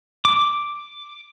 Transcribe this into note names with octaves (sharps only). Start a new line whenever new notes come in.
D6